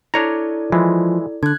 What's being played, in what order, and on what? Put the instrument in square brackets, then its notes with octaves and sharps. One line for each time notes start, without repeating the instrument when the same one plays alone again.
[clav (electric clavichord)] D4 C#5 A#5 [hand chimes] E4 A4 D5
[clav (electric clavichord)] E3 G#3 [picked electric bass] F3
[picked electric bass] D3 [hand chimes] F#6 G#6